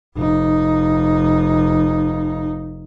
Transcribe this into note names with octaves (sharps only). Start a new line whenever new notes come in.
F1 D#4